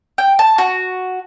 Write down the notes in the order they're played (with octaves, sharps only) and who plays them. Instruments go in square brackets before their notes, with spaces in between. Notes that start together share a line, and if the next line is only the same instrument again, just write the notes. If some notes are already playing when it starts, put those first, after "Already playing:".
[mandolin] G5
A5
F#4